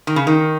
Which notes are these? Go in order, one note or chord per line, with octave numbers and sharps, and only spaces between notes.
D#3
C#3
D#3